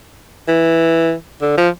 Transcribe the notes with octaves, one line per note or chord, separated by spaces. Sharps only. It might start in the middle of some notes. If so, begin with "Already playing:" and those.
E3
D3
F3